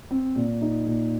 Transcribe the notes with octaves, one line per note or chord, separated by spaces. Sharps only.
C4
A#2
D#4
A#2